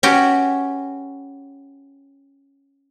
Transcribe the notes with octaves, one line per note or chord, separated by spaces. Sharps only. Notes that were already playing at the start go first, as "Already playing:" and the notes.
C#4 F#4 G4 B4 G5